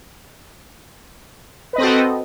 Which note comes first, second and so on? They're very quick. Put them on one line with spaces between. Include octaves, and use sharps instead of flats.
B4 D#5 C4 A4 F#4